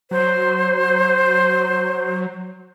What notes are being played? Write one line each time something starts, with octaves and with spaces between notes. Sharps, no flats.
F#3 C5